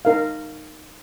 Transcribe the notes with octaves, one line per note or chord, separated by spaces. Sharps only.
D#4 A#4 F5